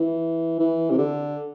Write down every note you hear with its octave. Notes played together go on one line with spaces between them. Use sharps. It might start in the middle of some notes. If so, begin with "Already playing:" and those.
Already playing: E3
E3
C3
D3